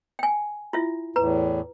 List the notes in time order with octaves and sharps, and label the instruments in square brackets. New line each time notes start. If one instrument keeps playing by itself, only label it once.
[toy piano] G5 G#5
E4 F4 E5
[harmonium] E2 A2 [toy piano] B4 A#5